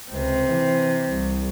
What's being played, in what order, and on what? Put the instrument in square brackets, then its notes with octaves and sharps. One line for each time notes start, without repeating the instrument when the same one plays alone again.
[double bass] C#2 [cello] C3
[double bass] E3
C2